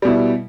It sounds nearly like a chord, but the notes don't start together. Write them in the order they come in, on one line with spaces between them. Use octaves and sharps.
G3 B2 E4